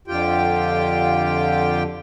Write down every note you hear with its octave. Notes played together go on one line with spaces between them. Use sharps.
F2 D3 F4 G4 G5